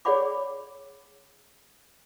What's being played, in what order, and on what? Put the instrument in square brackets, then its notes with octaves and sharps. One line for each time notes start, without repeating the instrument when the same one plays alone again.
[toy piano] G#4 C#5 D5 F#5 B5 D6